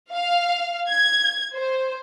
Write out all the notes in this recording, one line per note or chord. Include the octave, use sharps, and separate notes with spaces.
F5
G#6
C5